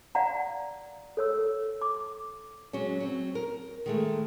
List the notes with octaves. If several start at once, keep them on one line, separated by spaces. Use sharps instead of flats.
D5 F5 F#5 A#5
A4 C#5 E6
D6
F#3 G#3 C#4
F#3 C4
A#4
D#3 G#3 A3